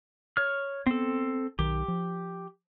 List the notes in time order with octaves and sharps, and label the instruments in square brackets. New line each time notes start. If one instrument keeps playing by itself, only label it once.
[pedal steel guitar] C#5 F6
[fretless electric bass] B3 [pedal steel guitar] C4 A4
[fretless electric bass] B1 D#3 [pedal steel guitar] G4
[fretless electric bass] F3